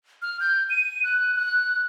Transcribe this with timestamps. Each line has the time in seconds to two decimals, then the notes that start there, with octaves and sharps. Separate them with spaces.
0.22 F6
0.40 G6
0.70 D#7
1.04 F#6
1.35 F#6